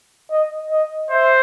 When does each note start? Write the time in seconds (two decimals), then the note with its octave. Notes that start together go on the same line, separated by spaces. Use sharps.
0.30 D#5
0.71 D#5
1.10 C5 E5